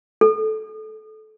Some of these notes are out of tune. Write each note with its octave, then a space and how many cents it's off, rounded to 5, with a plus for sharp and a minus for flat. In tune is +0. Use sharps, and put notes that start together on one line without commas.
A4 -20